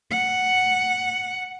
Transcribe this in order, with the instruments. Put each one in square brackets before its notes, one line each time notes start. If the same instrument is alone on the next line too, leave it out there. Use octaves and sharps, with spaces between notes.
[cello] F#5